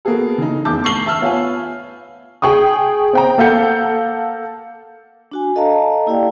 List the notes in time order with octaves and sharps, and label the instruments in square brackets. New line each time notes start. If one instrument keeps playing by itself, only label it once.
[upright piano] A#3 B3 F#4 G#4 A4
C#3 E3 D#4
F1 E2 A5 D6 G6
D2 C#6 C7 G7
E5 A5 E6 F6
B3 F4 C#5 E5 F5 G#5
[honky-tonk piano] G#4 G5 C#6 D#6
C4 G5 A#5
A#3 A4 F5 F#5 G6 C#7
[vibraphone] D4 F#4 G#5
A4 D#5 F5 A5 A#5
A#3 E4 G4 D5 F5 G5